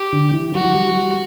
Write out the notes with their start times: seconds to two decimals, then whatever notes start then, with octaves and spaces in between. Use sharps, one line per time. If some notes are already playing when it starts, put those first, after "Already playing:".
Already playing: G4
0.13 D3
0.34 E3
0.54 F#3 F#4
0.65 F#3
0.75 G3
0.95 G3